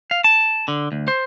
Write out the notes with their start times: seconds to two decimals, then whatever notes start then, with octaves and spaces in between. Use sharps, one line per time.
0.11 F5
0.24 A5
0.68 D3
0.92 D2
1.08 C5